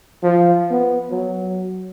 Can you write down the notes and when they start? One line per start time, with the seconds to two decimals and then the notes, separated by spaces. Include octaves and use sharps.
0.23 F3
0.71 B3
1.10 F#3